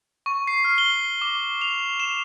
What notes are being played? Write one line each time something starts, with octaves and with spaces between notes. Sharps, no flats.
C#6
C7
F6
G7
D6
F7
E7